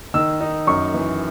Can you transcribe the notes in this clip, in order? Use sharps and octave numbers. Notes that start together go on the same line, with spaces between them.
D#3 E6
D#4
F#2 C#6
E3